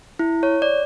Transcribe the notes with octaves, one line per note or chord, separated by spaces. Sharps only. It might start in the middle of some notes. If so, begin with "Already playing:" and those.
E4
C#5
D5